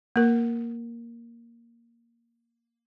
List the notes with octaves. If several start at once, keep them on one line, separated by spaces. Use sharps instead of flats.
A#3 A#4